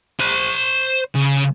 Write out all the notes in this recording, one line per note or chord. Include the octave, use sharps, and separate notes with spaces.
C5 B5
C#3